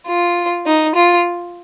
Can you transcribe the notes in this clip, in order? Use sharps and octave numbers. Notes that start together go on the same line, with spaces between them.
F4
D#4
F4